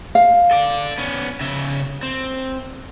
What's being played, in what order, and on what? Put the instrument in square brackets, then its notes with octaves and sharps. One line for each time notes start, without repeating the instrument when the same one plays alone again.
[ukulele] F5
[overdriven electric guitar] A4 D5
B3 C#4
C#3 E5
C4